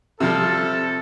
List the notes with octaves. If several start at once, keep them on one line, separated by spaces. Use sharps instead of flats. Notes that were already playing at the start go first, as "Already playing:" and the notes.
C3 F3 G3 A4